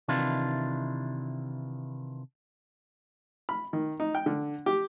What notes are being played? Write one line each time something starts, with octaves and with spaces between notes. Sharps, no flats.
C3 D#3 E3 D4 E4 F4
B5
D#3
D#4
G5
D3
G4